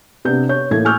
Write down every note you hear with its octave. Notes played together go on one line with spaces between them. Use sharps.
C3 B3 D4 G6
C#5 G6
A1 A2 A#3 A4 G#6
G#5 C#6 D6 E6 F6 G6